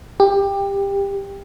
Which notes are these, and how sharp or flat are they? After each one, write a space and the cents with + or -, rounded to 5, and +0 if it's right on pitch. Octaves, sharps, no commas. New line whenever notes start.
G4 +20